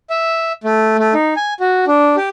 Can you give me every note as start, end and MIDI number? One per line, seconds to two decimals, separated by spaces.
0.10 0.52 76
0.64 0.97 57
0.99 1.14 57
1.14 1.34 63
1.36 1.54 80
1.60 1.85 66
1.87 2.16 62
2.16 2.29 67